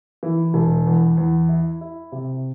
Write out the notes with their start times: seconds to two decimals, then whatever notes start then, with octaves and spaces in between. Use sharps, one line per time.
0.23 E3
0.54 E1
0.87 E2
1.17 E2
1.49 E4
1.81 E4
2.12 C3